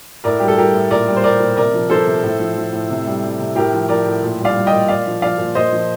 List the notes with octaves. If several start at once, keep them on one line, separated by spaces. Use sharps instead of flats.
A2 A#4 D5
G3 G4
A4
G3 G4 A#4
A2
A#2 A#4 D5
G3
C5
G3 A#4 D5
A#2
C3 A#4 D5
F3
F3 A4 C5
C3
A2
F3
F3
A2
C3
G3
G3
C3
A2 G4 A#4
F3
F3 A#4 D5
A2
A#2
G3
D5 F5
G3
D#5 G5
A#2
A#2 D5 F5
F3
F3 D5 F5
A#2
A#2 C5 D#5
F3